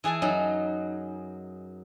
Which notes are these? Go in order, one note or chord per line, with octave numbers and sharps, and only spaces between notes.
E3 G#4 G#5 A5
F#2 F#3 D#4